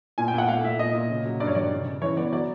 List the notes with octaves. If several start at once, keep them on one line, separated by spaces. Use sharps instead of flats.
A#2 G#5
G5
A#2 F#5
A3 F5
A#2 E5
A#2 D#5
A#2
C#3
F#3
G2 D5
C#5
D#3 D5
C#3
C#3
E3 C#5
B3 D5
F#3 D5